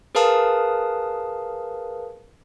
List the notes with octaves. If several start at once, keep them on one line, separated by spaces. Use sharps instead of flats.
G#4 A#4 B4 F5 A5 D#6